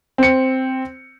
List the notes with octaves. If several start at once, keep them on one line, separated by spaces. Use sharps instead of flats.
C4 C#7